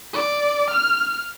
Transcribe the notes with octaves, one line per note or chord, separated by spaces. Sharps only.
D5
F6